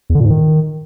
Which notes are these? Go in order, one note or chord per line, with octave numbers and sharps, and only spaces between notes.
E2
D3
A#2
G#2
D#3